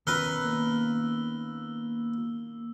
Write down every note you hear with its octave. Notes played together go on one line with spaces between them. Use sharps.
D#3 B3 C#4 A#4 B4 E6 G7
A#3